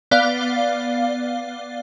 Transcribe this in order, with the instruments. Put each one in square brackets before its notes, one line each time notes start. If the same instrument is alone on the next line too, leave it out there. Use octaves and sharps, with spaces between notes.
[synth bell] B3 D5 F5 G7